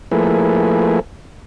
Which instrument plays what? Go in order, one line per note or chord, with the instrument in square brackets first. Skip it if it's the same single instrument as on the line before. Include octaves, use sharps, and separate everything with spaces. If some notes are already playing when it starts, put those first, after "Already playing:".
[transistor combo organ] F3 A3 A#3 E4 G#4 B4